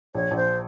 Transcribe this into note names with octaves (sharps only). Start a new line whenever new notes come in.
A#1 C#5
A#1
C5